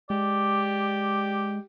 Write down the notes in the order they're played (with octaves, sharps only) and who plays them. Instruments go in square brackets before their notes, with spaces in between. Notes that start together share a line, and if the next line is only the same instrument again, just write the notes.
[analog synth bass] G#3 [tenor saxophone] G4 [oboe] D5